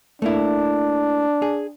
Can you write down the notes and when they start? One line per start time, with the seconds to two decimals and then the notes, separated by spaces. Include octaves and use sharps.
0.22 A3 A#3 D4 E4
1.42 G#4